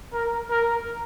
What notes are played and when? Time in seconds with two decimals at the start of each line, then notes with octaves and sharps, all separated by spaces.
0.13 A#4
0.50 A#4